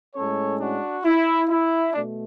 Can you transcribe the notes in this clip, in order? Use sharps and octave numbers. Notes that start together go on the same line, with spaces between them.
A2 G#3 C#4 A4 C#5
D4 F#4
E4
E4
B2 A3 D4